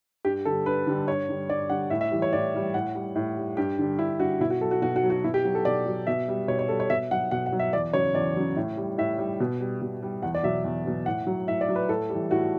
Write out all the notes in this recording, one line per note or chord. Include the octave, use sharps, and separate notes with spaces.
G2 G4
D3 G3 A4
G2 B4
D3 G3
G2 C#5
D3 G3
G2 D5
D3 G3 F#5
A2 E5
E5
E3 G3
C#5
A2 D5
E3 G3
A2 F#5
G3
A2
G3
G2 G4
D3 G3
G2 E4
D3 G3 F#4
B2 E4
F#4
F#3 A4
F#4
B2 F#4
F#4
F#3
F#4
B2 E4
G4
F#3 F#4
A4
B2 D5
F#3
B2 E5
G3
B2 C#5
C#5
G3 A4
C#5
B2 E5
F#3 F#5
B2 F#5
F#5
F#3
E5
E2 D5
C#3 F#3 C#5
E2 D5
C#3 F#3
A2
G3
A2 E5
G3
B2
G3
B2
G3
E2 F#5
D5
B2 F#3 E5
E2
B2 F#3
A2 F#5
F#3
A2 E5
D5
F#3
B4
A2 A4
E3 G3
A2 F#4